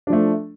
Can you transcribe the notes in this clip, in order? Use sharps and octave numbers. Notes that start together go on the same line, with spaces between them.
F3 A3 D4